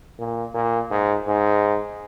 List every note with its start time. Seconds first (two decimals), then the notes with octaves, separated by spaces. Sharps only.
0.19 A#2
0.54 A#2
0.91 G#2
1.27 G#2